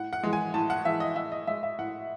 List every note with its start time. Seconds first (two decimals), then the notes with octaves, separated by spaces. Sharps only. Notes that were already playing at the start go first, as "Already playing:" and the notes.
Already playing: A2 F#5
0.13 F#5
0.23 E3 G#3
0.33 G#5
0.54 A2 A5
0.70 F#5
0.85 E3 G#3 E5
1.00 D#5
1.16 A2 E5
1.32 D#5
1.47 G#3 E5
1.63 E5
1.79 A2 F#5